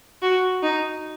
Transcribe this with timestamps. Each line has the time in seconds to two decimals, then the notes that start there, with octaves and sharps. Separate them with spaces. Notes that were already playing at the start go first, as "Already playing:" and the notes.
0.22 F#4
0.63 D#4